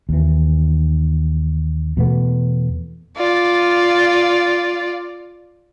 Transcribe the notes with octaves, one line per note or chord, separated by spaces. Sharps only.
D#2 E3
E2 B2 A3 B3
F4 D5